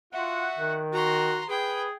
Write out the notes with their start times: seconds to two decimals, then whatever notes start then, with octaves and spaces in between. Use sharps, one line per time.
0.13 F4 F#4 E5 F#5
0.59 D#3
0.93 F#4 A#5 C6
1.49 G#4 B4 G5